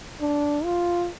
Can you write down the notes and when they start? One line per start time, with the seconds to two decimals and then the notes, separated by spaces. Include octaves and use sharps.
0.21 D4
0.64 F4